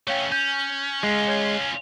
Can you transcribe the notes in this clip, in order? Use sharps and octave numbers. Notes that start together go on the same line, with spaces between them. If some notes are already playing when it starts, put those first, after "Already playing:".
A3 C#4 C#5 F5 G5
C#4 G6
G#3 C#4 F4
C#5 G#6 G7